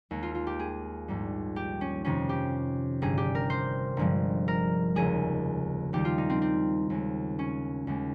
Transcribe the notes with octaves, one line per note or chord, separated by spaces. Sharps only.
D#2 D#3 G#3
F4
F4
G4
G#4
A#1 G#2 G3
G4
C#4
F2 C3 D#3 C#4
G4
G1 G2 G3 G#4
G4
A#4
C5
G1 G2 F3 G#3
A#4
F1 D#2 C#3 G#3 G#4
D#2 D#3 G3 G4
F4
D#4
C4
C4
D#2 C#3 G#3
C#4
D#2 C#3 G#3